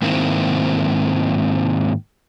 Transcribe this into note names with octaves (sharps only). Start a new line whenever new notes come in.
G#2 D#3 A#3 C4 E4